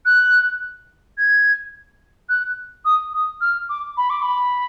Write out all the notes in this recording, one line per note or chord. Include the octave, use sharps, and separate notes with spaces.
F#6
G#6
F#6
D#6
D#6
F6
D6
B5
D6
B5